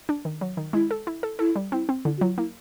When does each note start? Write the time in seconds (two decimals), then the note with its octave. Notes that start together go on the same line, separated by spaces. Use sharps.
0.09 D4
0.25 D#3
0.41 F#3
0.57 D#3
0.73 G#3 E4
0.91 A4
1.07 E4
1.23 A4
1.39 E4 A4
1.56 G3
1.72 C4 E4
1.89 C4
2.05 D3 E4
2.17 F#4
2.21 F#3 F4
2.37 A#3 E4